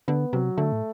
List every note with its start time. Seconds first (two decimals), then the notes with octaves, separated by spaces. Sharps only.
0.08 D3 B3
0.33 C3 F#3
0.57 D3 A3
0.72 A2